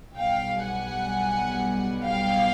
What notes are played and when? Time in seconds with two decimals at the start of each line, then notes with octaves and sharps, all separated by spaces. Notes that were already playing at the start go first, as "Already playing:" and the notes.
0.16 B1 B2 G3 F5 G5
0.64 F#5 G#5
2.05 F5 G5